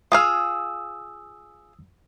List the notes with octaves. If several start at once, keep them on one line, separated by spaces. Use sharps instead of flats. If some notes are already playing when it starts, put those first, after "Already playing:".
F4 G#4 F5 D#6 E6